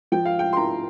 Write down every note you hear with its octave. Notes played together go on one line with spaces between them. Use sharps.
F3 G5
F5
G5
C6
E4 A#5